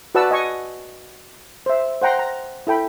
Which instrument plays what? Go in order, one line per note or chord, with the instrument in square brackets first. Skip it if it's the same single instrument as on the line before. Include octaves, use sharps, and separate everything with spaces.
[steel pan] F#4 B4 D5 F#5 A5 E6
D#5 G#5 C#6
C5 E5
C5 F#5 G5 A#5 C6
A#5
E4 A4 G5 B5